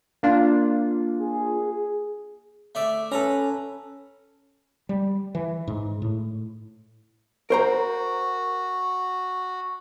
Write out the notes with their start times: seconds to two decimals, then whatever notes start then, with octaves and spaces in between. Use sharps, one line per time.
0.23 A#3 D4 F4
1.19 G#4
2.75 A3 D5 E5
3.12 C#4 A4 B4 A#5
4.89 G3
5.35 E3
5.67 G#2
6.02 A2
7.50 F#4 A#4 C5 A#5